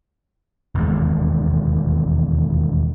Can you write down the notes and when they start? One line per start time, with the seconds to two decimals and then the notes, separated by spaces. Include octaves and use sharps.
0.75 E1 D#2 G#3